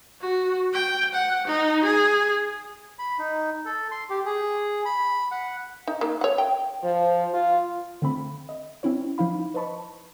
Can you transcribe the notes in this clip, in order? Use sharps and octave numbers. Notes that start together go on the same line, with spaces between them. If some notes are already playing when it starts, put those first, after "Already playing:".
F#4
G5
F#5
D#4
G#4
B5
D#4
A4
C6
G4
G#4
B5
F#5
D#4
A#3
C#5 F#5
G5
F3
F4
D3 A3 C4 B5
D#5
C4 C#4 E4 C#5
F3 D#4 E4 F5 B5
B4 C5 D#5 A5 B5 C#6